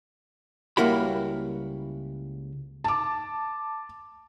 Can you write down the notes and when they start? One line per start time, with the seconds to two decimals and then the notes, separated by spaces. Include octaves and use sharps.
0.77 C#2 G3 A#3 E4 F#4 B5
2.84 A5 D6